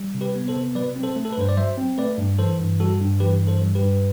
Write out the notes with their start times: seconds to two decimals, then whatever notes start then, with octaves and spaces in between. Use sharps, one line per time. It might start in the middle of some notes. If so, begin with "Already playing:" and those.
Already playing: G3
0.14 C3
0.21 G4 B4
0.36 B3
0.48 A4 C5
0.55 C3
0.75 F#3 B4 D5
0.96 C4
1.03 A4 C5
1.16 A3
1.25 A4
1.32 B4
1.38 G2 C5
1.49 D5
1.57 F#3 C5 E5
1.78 C4
1.98 A3 B4 D5
2.18 G2
2.39 E3 A4 C5
2.60 G2
2.80 G3 F#4 A4
3.00 G2
3.20 E3 G4 B4
3.40 G2
3.47 A4 C5
3.61 G3
3.75 G4 B4
3.82 G2